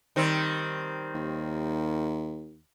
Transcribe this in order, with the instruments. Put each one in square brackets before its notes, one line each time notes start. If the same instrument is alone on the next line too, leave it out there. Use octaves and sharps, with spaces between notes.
[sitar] D#3 G3 C4
[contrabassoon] D#2